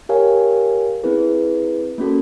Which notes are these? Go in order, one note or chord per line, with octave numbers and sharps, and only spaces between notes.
G4 A#4 C#5 F5 G#5
C4 E4 G#4 B4
A#3 C#4 F#4 A4